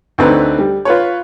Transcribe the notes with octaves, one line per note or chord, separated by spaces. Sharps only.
D2 D3 C4 D#4 B4
G3
F4 B4 C#5